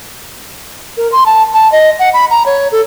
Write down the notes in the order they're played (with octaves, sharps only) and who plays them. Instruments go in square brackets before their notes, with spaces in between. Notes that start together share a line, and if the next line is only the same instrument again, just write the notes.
[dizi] A#4
C6
A5
A5
D#5
F#5
B5
A#5
C#5
A4